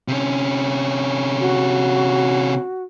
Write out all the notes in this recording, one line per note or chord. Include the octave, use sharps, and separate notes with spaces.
C3 C#4
F#4